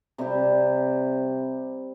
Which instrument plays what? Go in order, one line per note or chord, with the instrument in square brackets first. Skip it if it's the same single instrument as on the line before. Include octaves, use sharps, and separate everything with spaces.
[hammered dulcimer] C3 G3 C4 G4